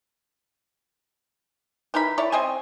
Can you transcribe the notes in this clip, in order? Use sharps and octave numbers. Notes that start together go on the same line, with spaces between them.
E3 D#4 A#4 B5
E4 C#5 D5
C4 D#5 E5 G#5